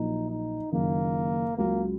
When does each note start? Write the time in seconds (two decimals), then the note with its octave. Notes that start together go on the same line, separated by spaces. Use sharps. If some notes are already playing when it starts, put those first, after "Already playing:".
Already playing: A#1 A#2 F#3 A#3 D#4
0.31 D#4
0.72 F#1 F#2 D#3 A#3
1.57 C#2 C#3 F#3 A#3